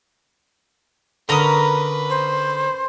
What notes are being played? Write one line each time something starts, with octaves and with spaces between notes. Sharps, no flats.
D3 C#4 A#4 B4 A#5 D#6
C5